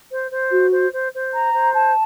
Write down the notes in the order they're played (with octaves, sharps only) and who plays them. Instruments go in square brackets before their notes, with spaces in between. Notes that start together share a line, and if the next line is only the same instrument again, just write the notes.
[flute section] C5
C5
F#4
C5
C5
C5
A#5
C5
A5